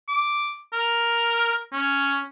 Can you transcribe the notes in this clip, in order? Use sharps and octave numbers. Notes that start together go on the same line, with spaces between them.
D6
A#4
C#4